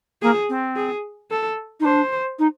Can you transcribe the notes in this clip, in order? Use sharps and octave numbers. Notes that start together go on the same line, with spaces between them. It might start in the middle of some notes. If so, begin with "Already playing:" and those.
A#3 G#4
C4
G#4
A4
D#4
D4 C5
D#4